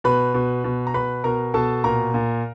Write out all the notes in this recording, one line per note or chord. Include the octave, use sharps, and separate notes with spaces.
B2 B4 B5
B2
B2
A#5
B2 B4 B5
B2 A#4 A#5
B2 A4 A5
A#2 A#4 A#5
A#2